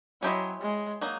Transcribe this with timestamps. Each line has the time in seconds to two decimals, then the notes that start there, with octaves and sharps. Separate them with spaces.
0.22 F#3 C#4 E4 G4 C5 D#5
0.62 G#3
1.01 F#3 A#3 D#4